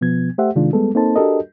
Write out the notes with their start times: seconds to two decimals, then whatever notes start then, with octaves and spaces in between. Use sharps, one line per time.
0.01 B2 F3 B3 G#6
0.38 A3 G4 C5 E5 F#5
0.55 C3 D#3 G#3 D4 F4
0.73 G3 G#3 B3 A4
0.95 A#3 C4 D#4 A4 C5 A5
1.16 D4 F#4 G4 A4 A#4 D#5